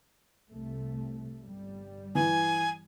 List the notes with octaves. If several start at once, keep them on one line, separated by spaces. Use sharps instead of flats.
C2 C3 A3
G1 G3
E3 G#5